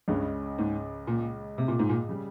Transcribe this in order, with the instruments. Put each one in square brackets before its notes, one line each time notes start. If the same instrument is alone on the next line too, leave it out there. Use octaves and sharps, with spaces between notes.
[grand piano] C#2 C#3 G#3 C#4 [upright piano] G2
[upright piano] G#2
A#2
C3
A#2
G#2
A#2
[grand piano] C#3 G3